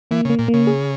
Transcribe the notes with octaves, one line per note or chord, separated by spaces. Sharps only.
E3 A#3
C#3 A#3
A#2
A#3
C#3
G#4